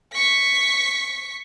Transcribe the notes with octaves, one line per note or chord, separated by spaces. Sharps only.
C#6 B6